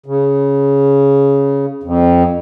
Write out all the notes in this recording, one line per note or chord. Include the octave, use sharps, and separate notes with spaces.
C#3
F2